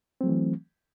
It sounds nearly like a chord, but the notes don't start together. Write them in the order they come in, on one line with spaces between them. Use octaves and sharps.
C4 F#3 A3 E3